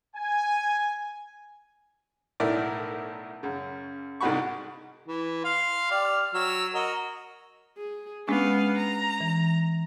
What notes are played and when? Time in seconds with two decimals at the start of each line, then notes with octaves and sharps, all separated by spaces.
0.16 G#5
2.40 B1 A2 E4 A#4 D5
3.43 F#2 C#3
4.21 C2 G#2 D#4 F#4 B5 C#6
5.08 E3
5.44 F5 C6
5.91 G4 D5 F6
6.34 F#3 E6
6.74 F#4 A#4 D#5
7.77 G#4
8.28 G#3 B3 C#4 D4 F5
8.79 A#5
9.21 E3